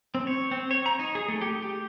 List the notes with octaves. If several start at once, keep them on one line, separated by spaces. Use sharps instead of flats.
C4
C#5
C4
C#5
A#5
D#4
G#4
A3
G4
G4